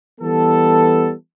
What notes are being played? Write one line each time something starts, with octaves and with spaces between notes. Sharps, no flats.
E3 G3 B3 A4